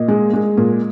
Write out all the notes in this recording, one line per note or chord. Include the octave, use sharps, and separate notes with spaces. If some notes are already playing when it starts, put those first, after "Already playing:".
Already playing: A#2 D#5
G#3
G#3
A#2